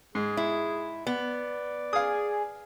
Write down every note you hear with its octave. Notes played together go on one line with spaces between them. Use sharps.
G#2 G#4
E4
B3 D5
G#4 F5 D#6